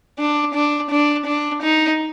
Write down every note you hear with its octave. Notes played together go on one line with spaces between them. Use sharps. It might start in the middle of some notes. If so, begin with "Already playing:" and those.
D4
D4
D4
D4
D#4